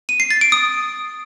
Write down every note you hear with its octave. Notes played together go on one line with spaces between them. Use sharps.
D#7
C7
A6
D7
D#6